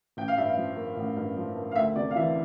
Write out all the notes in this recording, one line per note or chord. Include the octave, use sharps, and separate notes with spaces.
A1 G5
F5
G2 E5
F5
F3
A#3
A1
G2
F3
A#3
F5
D2 E5
C3 D5
F5
E3 E5